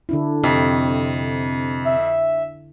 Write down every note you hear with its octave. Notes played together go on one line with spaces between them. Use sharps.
D3 D4 E4
F2 C3
E5